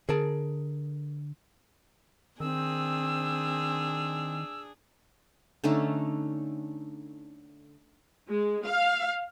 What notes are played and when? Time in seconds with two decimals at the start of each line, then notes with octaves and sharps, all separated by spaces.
0.09 D3 G#4 A#4 A5
2.40 D#3 C4 D4 G#4 E6
5.64 D3 A3 C#4 D#4
8.29 G#3
8.66 F5